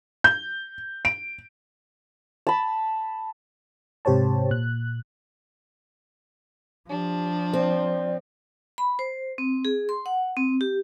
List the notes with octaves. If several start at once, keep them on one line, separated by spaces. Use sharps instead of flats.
G6
D7
A5 B5
G#2 C3 G4 C5 C#5 A5
A#2 F#6
F3 D4 G4
C4 D5
B5
C5
C4
G#4
C6
F#5
C4
G4